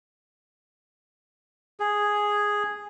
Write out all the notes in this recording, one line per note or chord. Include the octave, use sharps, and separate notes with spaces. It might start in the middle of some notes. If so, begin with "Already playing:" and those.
G#4